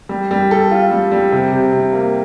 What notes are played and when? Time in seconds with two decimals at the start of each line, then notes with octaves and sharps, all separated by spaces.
0.09 G3
0.31 G3
0.51 A4
0.71 F4
0.91 G3
1.12 G3
1.32 C3
1.52 C3
1.72 C3
1.93 A#3